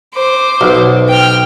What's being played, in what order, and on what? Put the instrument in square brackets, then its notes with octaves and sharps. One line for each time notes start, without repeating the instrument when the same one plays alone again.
[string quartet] C5 D6
[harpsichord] B1
[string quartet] G5 F6